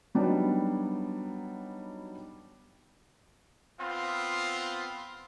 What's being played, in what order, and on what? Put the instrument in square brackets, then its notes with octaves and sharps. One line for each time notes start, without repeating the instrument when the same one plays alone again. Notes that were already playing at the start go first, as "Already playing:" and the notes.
[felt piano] F#3 G3 B3 D4 D#4
[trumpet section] B3 C4 F4